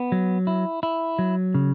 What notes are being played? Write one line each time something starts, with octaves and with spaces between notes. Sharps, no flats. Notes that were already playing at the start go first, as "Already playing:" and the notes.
Already playing: B3
F#3
E4
E4
F#3
C#3